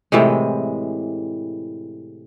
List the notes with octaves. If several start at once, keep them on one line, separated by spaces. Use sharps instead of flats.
A2 C3 E3 G#3